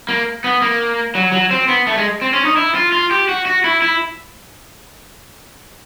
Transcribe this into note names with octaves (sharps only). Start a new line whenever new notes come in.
A#3
B3
A#3
F#3
F#3
C4
B3
A3
G#3
C4
C#4
D#4
E4
F4
F4
G4
F#4
F#4
E4
E4